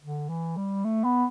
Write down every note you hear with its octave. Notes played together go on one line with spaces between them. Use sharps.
D3
E3
G3
A3
B3